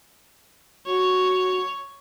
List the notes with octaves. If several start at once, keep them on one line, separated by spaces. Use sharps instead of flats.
F#4 C#5